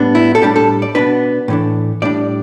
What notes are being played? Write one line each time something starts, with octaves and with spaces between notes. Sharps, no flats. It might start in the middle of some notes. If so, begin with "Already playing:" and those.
Already playing: A2 G3 B3 D4
E4
A4
A2 G3 D4 G4
A4
D5
B2 B3 D4 B4
A2 E3 A3 D4
A2 G3 D4 D5